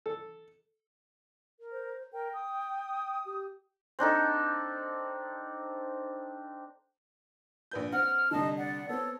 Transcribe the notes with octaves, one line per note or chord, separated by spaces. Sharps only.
A4
A#4
C5
A#4 G5
D#6
G4
C4 D4 D#4 A4
A#1 B4 G6
C4 F#5 F6
C2 D3 D#4 D#5 A5
D5 F#5
B3 C4 A4 C#5